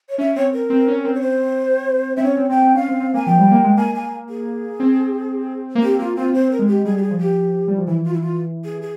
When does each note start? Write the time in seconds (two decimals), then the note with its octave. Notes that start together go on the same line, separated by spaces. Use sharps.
0.09 C#5
0.18 C#4 E5
0.35 C4 C#5
0.53 A#4
0.70 C4
0.88 C#4
1.05 C4
1.15 C#5
1.21 C5
2.17 C4 E5
2.24 C#4 C#5
2.37 C4
2.50 C4 G5
2.62 C4
2.75 C#4 F5
2.88 C4
3.00 C4
3.14 A#3 G#5
3.26 F3 G5
3.39 G3
3.51 A#3
3.64 G#3
3.77 A#3 G#5
3.95 G#5
4.29 G#4
4.80 C4
5.75 A#3
5.82 C4 G4
5.99 A#3 F4
6.17 C4 F4
6.33 C4 C5
6.51 A#4
6.59 G#3
6.67 G4
6.85 G3 G#4
6.97 G4
7.02 G#4
7.11 F3
7.19 G4
7.68 G3
7.78 F3
7.87 E3 E4
8.04 F4
8.14 E4
8.21 F4
8.65 G#4
8.82 G#4